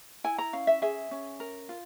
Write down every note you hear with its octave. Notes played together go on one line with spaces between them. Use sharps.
E4 G#5
A#5
C#4 F5
E5
G#4 E5
C#4
A#4
F4